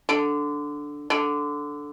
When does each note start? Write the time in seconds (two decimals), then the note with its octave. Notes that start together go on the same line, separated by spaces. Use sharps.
0.09 D3
1.10 D3